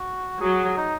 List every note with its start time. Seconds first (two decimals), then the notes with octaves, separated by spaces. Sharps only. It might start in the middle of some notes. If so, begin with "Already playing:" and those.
Already playing: F#4
0.41 F#3 G#4
0.77 D#4